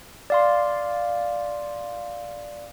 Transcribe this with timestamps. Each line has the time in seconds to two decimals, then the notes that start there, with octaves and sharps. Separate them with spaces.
0.30 D5 F5 C6